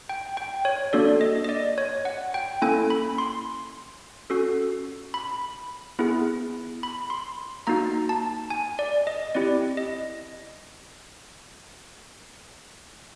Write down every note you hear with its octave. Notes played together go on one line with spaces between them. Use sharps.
G5
G5
C#5
A#3 D4 F#4 A4 D5
D#5
D#5
D5
C#5
F#5
G5
A#3 C#4 E4 A4 G#5
B5
C6
C#4 F#4 A4
B5
B3 E4 G#4
B5
C6
A#3 D#4 F#4 A#5
A5
G#5
D5
D#5
C4 E4 G4 D5
D#5